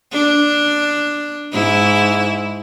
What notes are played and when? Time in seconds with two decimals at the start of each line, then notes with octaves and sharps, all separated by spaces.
0.12 D4
1.53 G#2 E4